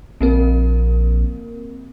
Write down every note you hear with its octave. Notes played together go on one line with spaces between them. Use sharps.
A#1 A#3 C4 A#4